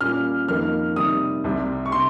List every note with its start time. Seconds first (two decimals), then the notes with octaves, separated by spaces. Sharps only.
0.01 A#2 G3 C#4 F6
0.48 F2 D#3 A#3 D#4 F6
0.96 C3 D#3 G3 D#6
1.44 C2 C3 G3
1.86 C#6
1.92 C3 C6